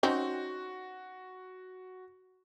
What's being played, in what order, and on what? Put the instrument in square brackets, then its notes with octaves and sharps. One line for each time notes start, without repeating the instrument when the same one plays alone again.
[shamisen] C4 C#4 D#4 [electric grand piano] F#4